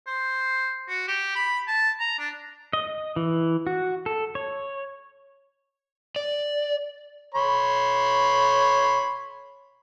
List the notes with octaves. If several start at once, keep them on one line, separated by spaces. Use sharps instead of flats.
C5
F#4
G4
B5
A5
A#5
D4
D#5
E3
F#4
A4
C#5
D5
C#5 B5 C6